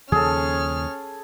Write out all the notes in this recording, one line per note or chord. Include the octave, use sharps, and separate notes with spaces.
D#2 C#3 F3 C#4 G#4 A4 F6